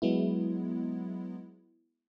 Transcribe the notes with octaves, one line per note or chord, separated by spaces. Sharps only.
F#3 G#3 B3 E4